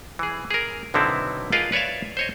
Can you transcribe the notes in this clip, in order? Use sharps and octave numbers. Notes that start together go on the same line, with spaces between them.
E3 G#4
G#4 A#4
B1 D3 D#3 C4 E4 A5
F4 G#4 A#4 B4 D#5 F5
B4 C#5 D5 E5 F5
C5 C#5 D#5